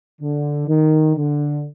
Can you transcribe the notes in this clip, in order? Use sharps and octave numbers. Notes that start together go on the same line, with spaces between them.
D3
D#3
D3